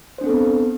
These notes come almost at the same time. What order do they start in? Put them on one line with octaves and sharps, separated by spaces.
C5 D4 C4 A4 B3